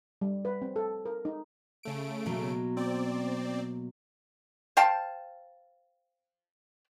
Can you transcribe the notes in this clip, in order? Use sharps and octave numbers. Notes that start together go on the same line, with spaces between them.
G3
B4
C4
A4
A#4
D#4
C#3 A3 D7
B2 F#3 A#3
C4 D5
C5 F5 G5 A5